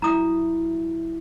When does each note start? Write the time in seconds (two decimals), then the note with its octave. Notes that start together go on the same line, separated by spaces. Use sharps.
0.02 F#3 E4 A#5 D#6